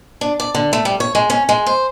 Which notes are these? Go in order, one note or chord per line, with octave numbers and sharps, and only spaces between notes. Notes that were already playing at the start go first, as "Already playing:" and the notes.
D4
D5
D3
A3
G3
C#5
G#3
C#4
G#3
C5